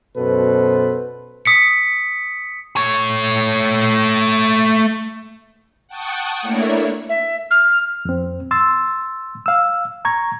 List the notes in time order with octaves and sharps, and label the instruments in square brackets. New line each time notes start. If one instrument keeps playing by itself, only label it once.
[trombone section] F#2 B2 A4 B4 C5
[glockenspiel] D#6 B6 C#7
[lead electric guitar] A3 C#5
[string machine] F#5 G5 A5 C#6 D#6 F#6
A3 A#3 D4 E4 C#5
[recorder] E5
F6
[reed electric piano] F2 C4
C6 E6 A6
F5 E6
A#5 C#6 G#6